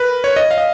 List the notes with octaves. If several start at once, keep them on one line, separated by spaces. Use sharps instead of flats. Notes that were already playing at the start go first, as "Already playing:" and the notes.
Already playing: A#4 B4
C#5
D#5
F5
D#5